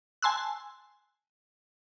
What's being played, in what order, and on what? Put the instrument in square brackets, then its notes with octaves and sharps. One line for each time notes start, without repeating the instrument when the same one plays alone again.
[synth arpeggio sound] G#5 A5 C6 E6 F#6